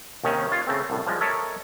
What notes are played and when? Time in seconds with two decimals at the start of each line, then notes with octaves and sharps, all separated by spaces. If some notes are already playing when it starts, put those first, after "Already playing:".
0.24 D#2 C3 D#3 C#4
0.49 F4 C#5
0.67 C#3 A3 C4
0.90 C2 A2
1.07 F3 G3 G#3
1.21 A4 A#4 C#5 D#5 E5